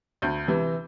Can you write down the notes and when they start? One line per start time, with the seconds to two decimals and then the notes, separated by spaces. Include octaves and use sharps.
0.22 D2 G6
0.47 C3 E3